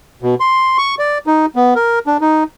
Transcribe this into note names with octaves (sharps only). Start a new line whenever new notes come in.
B2
C6
C#6
D5
D#4
B3
A#4
D4
D#4